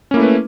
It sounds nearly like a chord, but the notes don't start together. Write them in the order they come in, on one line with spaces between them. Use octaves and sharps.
C#4 A#3 E4 A3 B4